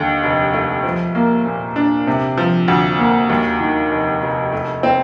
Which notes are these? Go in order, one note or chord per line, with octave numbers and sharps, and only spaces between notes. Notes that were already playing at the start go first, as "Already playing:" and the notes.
Already playing: D#2 D3
F1
A3
F3
A#3
A#2
D4
C3
F3
D2
A#3
D#2
D#3
F1
F1
A3
C4